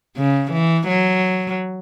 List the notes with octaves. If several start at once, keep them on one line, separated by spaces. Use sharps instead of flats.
C#3
E3
F#3